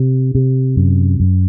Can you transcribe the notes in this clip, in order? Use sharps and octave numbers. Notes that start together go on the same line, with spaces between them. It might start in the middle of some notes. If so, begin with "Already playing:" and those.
Already playing: C3
C3
F#2
F#2